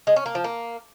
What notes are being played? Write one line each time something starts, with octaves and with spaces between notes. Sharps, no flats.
G#3
C#4
A#3
F3
A#3